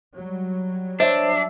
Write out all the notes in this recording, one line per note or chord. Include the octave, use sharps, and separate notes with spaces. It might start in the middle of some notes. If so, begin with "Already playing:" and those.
F#3 G3
D4 C5 C#5 E5